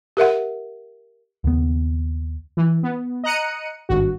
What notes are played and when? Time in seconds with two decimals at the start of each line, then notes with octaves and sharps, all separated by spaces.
0.17 G4 A#4 E5 F#5
1.44 D#2 C#3 B3
2.57 E3
2.83 B3
3.24 D#5 A#5 F#6 C#7 D#7
3.89 G#1 G2 F#4